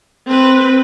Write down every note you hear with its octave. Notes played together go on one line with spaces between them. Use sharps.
C4 B4